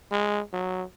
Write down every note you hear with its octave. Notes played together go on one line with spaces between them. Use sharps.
G#3
F#3